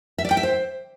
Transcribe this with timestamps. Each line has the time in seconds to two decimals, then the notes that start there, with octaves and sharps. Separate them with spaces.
0.18 E5
0.25 D5
0.31 G5
0.37 E5
0.43 C5